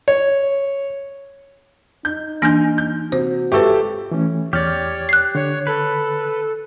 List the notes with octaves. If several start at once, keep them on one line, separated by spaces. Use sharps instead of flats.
C#5
D#4 G6
E3 A#3 D4 G#5 F6 G6
G6
C3 F#4 C5
G#1 F4 G4 A4 B4 E5 C#6
E3 A3 C#4
E2 G4 C#5 D5 F6
F#6 C7
D3 C#5
A4 B4